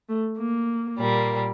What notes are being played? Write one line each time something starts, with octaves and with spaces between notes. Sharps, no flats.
A3
A#3
A#2 G3 A#3